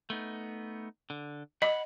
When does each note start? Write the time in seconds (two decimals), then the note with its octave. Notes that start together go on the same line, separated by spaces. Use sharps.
0.10 A3 B3 D#4
1.10 D3
1.62 D#5 F#5 B5